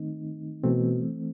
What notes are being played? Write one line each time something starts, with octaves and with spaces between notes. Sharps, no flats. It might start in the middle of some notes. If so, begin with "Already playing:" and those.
Already playing: D#3 A3 C4 D#4
B2 E3 A3 C4